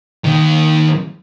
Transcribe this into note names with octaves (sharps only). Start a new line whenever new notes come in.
D#2 D#3